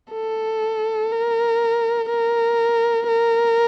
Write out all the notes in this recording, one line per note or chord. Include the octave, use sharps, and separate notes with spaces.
A4
A#4
A#4
A#4